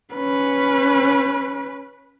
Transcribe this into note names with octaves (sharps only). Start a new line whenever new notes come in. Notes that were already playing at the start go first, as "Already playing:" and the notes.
C#4 B4